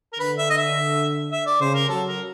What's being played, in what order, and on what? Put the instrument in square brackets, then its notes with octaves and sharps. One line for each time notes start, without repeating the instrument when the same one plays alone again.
[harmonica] A#4
[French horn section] D3 [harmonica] B4
[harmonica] E5
D#5
E5
E5
D5
[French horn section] C#3 [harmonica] C5
[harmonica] A#4
[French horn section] F#3 [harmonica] A4
[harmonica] A#4